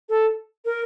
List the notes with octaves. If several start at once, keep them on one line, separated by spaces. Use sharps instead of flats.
A4
A#4